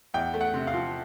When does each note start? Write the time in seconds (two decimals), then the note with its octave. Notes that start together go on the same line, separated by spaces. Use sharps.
0.14 E2 G5
0.34 A3
0.41 F#5
0.54 C3
0.67 F5
0.74 F3